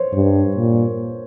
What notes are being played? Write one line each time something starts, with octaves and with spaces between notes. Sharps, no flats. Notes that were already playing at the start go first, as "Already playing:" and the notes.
Already playing: C5 C#5
G2
A#2